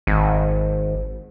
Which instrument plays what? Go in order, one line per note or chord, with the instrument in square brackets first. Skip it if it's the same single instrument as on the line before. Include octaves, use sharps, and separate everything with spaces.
[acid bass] G#1